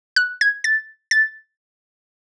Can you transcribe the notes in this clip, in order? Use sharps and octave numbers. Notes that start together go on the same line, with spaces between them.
F#6
G#6
A6
A6